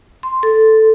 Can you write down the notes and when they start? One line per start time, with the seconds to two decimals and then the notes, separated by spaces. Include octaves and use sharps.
0.23 C6
0.43 A4